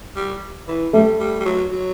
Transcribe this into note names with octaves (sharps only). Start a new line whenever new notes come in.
G3
E3
G3 A3
G3
G3
F#3
F#3